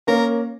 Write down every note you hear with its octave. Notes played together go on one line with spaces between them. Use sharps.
A#3 C#4 A#4